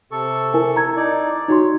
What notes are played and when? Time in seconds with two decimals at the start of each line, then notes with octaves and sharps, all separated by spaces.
0.12 C3 A4 C#6
0.54 E4 A#4 G#5
0.76 A#5 G#6
0.96 D#4 D5
1.48 D#4 F#4 C#5 C6